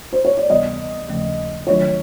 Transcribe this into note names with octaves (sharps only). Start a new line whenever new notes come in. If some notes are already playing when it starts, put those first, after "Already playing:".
C5
C#5
D5
D2 C3 E3 G3 B3 D#5
D#2 C#3 F3 A3
D#3 F#3 A3 D4 F4 C#5